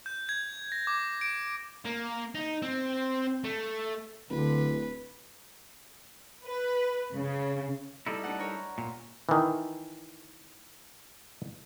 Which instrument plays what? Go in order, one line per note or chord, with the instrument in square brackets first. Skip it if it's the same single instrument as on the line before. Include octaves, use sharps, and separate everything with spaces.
[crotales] G6
G#6
A#6
D6
D7
[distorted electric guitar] A#3
D#4
C4
A3
[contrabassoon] D1 [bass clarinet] D3 [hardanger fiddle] B4
[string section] B4
C#3
[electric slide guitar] G3 D#4 E4 [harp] A4
[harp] D4 A4 F#5
A#4 C#5
[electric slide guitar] A#2
[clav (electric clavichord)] D#3 E3